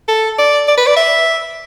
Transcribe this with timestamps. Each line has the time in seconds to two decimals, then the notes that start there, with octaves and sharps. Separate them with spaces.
0.08 A4
0.39 D5
0.68 D5
0.78 B4
0.87 D5
0.97 E5